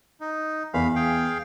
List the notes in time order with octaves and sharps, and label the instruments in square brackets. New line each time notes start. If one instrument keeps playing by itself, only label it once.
[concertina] D#4
[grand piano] E2 [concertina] F5 B5
[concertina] G#4 F5 G5